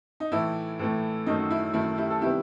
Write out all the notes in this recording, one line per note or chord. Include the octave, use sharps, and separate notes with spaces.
D#4
A2 E3 A3 E4
A2 E3 A3
F#2 D#3 A3 D#4
F#4
E4
F#2 D#3 A3 E4
E4 G4
A4
C3 D#3 G3 B3 E4 G4